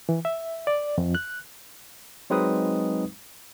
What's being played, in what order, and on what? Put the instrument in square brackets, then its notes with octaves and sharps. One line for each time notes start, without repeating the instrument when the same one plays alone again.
[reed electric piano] E3
E5
D5
F2
F#6
[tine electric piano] F#3 G#3 C4 D#4 B4 D#6